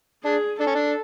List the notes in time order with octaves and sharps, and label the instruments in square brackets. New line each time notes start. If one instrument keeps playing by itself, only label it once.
[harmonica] D4 [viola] G#4
[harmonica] D4 [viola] A4
[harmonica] C#4
D4